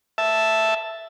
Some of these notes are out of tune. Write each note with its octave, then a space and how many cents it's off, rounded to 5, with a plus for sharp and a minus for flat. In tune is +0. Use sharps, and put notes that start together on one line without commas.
E5 +0 A5 +0